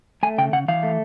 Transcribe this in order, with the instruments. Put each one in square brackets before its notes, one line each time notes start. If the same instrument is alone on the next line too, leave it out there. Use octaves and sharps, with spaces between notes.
[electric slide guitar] A3 G#5
C#3 G5
C#3 F#5
E3 F5
A3